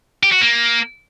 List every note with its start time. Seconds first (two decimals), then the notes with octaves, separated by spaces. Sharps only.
0.23 G4
0.32 F#4
0.41 A#3